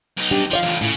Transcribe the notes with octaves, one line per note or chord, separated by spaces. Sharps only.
B1 D#4
G3 D4 G4
F3 F4 D5 F5
E2 A2
A2 C#3